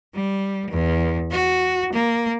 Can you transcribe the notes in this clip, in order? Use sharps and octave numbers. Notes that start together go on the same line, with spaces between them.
G3
E2
F#4
A#3